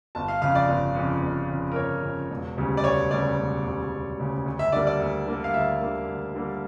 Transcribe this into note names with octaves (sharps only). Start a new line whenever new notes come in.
G1 A5
F5
F2 C#3 F5
D5
G1
F2 C#3
G1
F2 C#3
A#4
G1 C#5
F2 C#3
E1
D2 C#3 G3
D5
E1 C#5
D2 C#3 G3 D5
E1
D2 C#3 G3
E1
D2 C#3 G3
D2
E5
D3 G3 A#3 D5
D5
D2
D3 G3 A#3
F5
D2 E5
D3 G3 A#3
D2
D3 G3 A#3